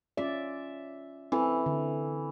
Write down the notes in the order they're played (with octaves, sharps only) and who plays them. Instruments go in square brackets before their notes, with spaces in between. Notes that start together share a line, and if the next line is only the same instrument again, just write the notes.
[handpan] C#4 F4 D5 [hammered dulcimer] E5
[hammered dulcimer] E3 [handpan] C4 A4
[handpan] D3